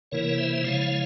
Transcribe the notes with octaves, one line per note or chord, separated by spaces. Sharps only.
C3 E3 A#3 E4 A#4 C#5
C5 E5
C#3 F3 G#3 E4 C#5 F5